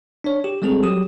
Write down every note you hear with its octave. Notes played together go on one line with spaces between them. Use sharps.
D4 C#5
G4
G3 G#3 C4 G#4 A4
F#3 G4 D#6